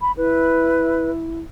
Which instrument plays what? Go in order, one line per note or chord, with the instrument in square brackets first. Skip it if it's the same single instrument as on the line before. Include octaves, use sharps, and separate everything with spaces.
[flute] B5
[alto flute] E4 [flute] B4